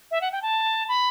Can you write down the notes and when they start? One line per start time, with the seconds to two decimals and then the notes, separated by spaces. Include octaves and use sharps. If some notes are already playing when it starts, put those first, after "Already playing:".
0.11 E5
0.21 F#5
0.32 G5
0.42 A5
0.88 B5